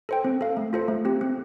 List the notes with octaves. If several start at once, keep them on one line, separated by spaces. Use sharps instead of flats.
A4 C5 G5
C4
A4 F5
A3
F4 A4 C5
A3
C4 G4
C4